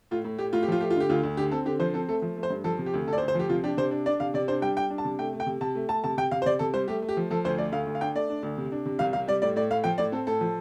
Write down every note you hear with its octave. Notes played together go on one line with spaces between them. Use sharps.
A2 F4
A2
A2 G4
A2 F4
G4
F3 F4
A3 G4
F4
D3 G4
D2 F4
D2
D3 G4
C4 A4
D3 G4
F3 C5
C4 A4
A3 A4
F3
A3
C5
G2
F3 A4
C3
G4
D2
D2 A4
D5
C5
D2
C5
F3 G4
C3 F4
D4 G4
C3 C5
D4
D4 D5
C3 F5
C3 D5
D4 C5
G3 G5
G3 G5
D4
A5
C3
A3 G5
A3
G5
C3
C3 A5
A3
A3 A5
C3 A5
C3 G5
C3 F5
C5
C3 D5
C3 A4
G3 C5
A3 G4
A3
G4
F3
F3 A4
D2 C5
A3 D5
D2 F5
D2
F5
D4 G5
A3 D5
D4
D2
C3
D4
C3
C2 F5
C3 F5
G3 D5
A2 D5
A2 D5
A2 F5
F3 G5
A2 D5
C4 A4
A2 A4
F3